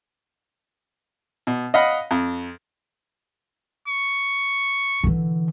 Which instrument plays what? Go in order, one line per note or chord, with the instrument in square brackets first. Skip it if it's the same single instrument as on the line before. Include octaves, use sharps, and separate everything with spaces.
[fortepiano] B2
D#5 F5 F#5 B5 D#6
F2
[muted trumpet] C#6
[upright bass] D3 E3